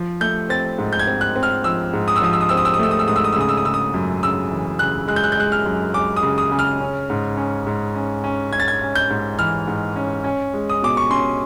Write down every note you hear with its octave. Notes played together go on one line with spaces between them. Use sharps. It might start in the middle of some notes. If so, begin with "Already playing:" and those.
Already playing: F3
A3 G6
C4 A6
G#2
G6
G#6
C4
F#6
C4
F6
F3 E6
G#2
D#6
E6
F3 D#6
E6
D#6
C4 E6
D#6
E6
D#6
A3 E6
D#6
E6
G#2 D#6
E6
D#6
E6
C#3 D#6
E6
D#6
C#3 E6
D#6
F#2
C#3 E6
E3
C#3 F#6
G#3 F#6
G6
F#6
G6
G#3 F#6
F6
F#2
G#3 D6
D#6
C#3
D#6
C#3
F6
C#4
G#2
C#4
G#2
C#4
C#4
C#4 G#6
A6
G#6
C#4
G6
G#2
E3 F6
G#2
C#4
C#4
G#3
D#6
B2 D6
C#6
C#4 C6